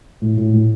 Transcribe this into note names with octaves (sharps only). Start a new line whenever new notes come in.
A2
A2
A2